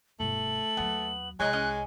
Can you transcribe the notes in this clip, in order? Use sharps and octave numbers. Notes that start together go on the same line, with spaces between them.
E1 G2 A3 F#7
D#2 F#3 B3
C2 G#3 C#5 D#5 A#5 F#6
C#4 D#5 G#5